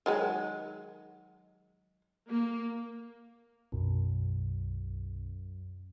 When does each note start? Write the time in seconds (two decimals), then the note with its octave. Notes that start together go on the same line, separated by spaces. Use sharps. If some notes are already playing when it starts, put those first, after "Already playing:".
0.06 D#3 F#3 G#3
2.29 A#3
3.72 B1 F#2